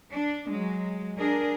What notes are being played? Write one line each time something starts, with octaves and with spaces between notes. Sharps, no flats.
D4
F#3 G#3
D4 G#4 A#4